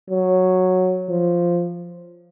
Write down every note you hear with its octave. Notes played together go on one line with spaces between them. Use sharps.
F#3
F3